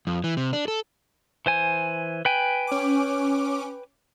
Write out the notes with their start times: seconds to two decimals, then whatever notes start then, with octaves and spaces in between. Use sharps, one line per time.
0.07 F2
0.24 E3
0.37 C3
0.53 D4
0.68 A4
1.46 E3 C5 G#5
2.25 B4 G5 G#5
2.67 C#4 D6